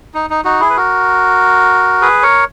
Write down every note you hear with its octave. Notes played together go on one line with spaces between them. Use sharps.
D#4
D#4
D#4 F#4
E4 G#4
B4
F#4 A#4
G#4 B4
A#4 C#5